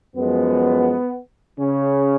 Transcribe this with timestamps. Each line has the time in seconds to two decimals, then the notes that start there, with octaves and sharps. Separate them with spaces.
0.16 F#2 F3 G#3 B3
1.60 C#3 C#4